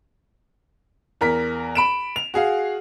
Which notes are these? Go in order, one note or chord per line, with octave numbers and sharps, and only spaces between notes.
E2 A#4 B6
B5 D7 E7
F7
F#4 G#4 F5